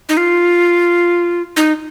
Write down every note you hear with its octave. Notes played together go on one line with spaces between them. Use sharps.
D#4
F4
D#4